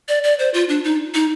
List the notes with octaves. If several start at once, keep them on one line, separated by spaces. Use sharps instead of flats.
D5
D5
C5
F4
D4
D#4
D#4